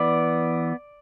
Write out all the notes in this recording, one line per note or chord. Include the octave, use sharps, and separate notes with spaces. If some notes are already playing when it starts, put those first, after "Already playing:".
Already playing: E3 B3 D5